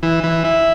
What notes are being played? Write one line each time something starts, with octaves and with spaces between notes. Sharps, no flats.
E3
E3
E4